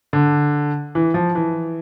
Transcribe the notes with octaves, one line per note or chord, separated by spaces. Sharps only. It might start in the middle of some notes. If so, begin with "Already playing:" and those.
D3
E3
F3
E3